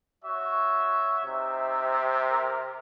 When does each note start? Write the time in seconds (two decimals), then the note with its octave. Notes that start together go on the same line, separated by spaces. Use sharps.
0.24 F#4 C#5 E5
1.25 C3 D#4 E5
2.30 A#4